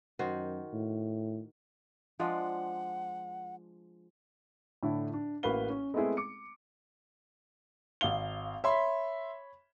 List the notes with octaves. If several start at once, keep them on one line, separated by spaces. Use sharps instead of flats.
F#2 D#3 F#4 C5
A2
F3 G#3 D4 F#5
A2 D3 D4 E4
D4
A1 A#3 F#4 B4 F5 G7
C#4
G#3 A3 B3 C4 E4 G#4
D6 C#7
G#1 F5 G7
C#5 E5 B5 C6